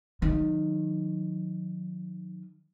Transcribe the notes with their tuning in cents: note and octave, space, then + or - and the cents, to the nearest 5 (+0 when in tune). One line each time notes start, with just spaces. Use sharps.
D#3 -10 F#3 -35